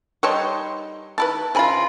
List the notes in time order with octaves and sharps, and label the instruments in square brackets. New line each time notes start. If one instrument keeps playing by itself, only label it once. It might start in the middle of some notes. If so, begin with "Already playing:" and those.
[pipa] G3 [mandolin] D#4 C6 C#6 [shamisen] B4 C#5 A5
[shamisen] D#3 E4 B4 [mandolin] A5
[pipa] C#3 F4 [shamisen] F3 G#5 B5 [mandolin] A#4